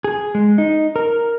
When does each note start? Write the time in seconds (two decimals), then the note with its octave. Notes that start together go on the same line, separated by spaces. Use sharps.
0.04 G#4
0.35 G#3
0.58 D#4
0.96 A#4